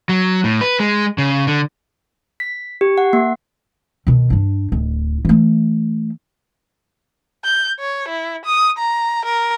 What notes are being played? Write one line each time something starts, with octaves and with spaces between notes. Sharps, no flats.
F#3
A2
B4
G#3
C#3
D3
B6
G4
F#5
A#3
B2 D#3
G2 D4
D1
E3 A3
G6
C#5
E4
D#6
A#5
A#4